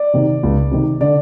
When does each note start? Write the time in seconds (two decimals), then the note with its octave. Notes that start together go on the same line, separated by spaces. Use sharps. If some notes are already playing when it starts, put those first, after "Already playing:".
Already playing: D5
0.14 C3 D#3
0.43 C#2
0.71 C3 D#3
1.01 D3 D5